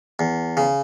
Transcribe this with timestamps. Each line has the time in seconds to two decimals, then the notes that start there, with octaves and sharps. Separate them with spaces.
0.19 E2
0.57 C#3